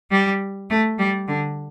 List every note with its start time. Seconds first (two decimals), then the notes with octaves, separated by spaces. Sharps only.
0.11 G3
0.70 A3
0.99 G3
1.28 D3